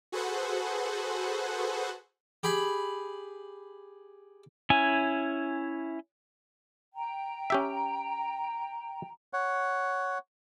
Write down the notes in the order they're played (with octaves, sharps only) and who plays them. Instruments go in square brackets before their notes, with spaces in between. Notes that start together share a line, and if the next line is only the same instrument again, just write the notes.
[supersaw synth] F#4 G#4 A4 B4 C5 F#5
[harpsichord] G4 G#4 B5
[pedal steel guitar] C#4 E4 G#5
[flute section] G5 A#5
[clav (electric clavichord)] C#4 G4 E5
[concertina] C#5 F#5